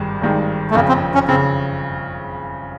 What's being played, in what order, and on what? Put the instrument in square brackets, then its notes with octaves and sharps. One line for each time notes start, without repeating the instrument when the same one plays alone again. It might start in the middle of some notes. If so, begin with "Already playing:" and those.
Already playing: [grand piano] G#1 G2 D#3 G#3
G#1 G2 D#3 G#3
[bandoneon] A3
[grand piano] F#1 F2 C#3 [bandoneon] A#3
[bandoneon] C4
C#4
[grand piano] C#3 [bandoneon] C4